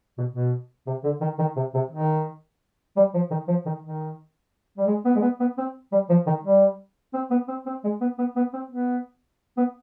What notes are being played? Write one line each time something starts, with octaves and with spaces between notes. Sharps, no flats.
B2
B2
C3
D3
D#3
D#3
C3
C3
D#3
G3
F3
D#3
F3
D#3
D#3
G3
G#3
B3
G#3
B3
B3
C4
G3
F3
D#3
G3
C4
B3
C4
C4
G#3
B3
B3
B3
C4
B3
B3